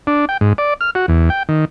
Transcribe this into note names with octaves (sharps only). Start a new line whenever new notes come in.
D4
G5
G#2
D5
F6
F#4
E2
G5
D#3